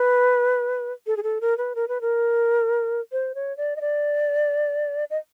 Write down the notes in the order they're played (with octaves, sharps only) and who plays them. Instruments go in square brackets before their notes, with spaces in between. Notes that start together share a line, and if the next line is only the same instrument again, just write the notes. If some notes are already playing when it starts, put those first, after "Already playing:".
Already playing: [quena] B4
A4
G#4
A4
A#4
B4
A#4
B4
A#4
C5
C#5
D5
D#5
D5
D#5